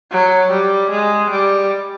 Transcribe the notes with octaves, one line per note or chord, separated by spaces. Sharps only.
F#3
G3
G#3
G3